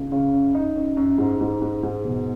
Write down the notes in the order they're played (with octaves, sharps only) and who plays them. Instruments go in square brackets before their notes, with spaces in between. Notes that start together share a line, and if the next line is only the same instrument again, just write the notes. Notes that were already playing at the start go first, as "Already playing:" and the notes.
Already playing: [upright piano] C#2
C#3
F#2
D#4
F#2
F#2
G#2
G#2
G#2
G#2
B2